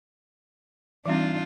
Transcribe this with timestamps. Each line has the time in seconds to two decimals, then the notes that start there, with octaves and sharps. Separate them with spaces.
1.06 E3 G3 C4 D4 D#4 F4